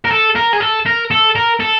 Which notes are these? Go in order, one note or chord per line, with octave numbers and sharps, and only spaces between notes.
A#4
A4
A#4
G#4
A4
A#4
A4
A#4
A4